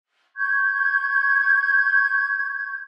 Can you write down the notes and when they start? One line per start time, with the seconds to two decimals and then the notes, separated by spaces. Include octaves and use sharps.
0.36 C#6 G6 G#6